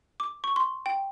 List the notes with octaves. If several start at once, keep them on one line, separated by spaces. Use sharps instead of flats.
D6
C#6
C6
G5